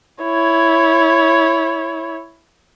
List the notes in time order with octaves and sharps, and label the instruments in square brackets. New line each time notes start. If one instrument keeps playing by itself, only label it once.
[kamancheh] E4 C#5